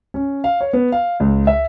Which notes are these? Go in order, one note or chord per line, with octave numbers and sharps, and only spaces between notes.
C#4
F5
C#5
B3
F5
C#2
E5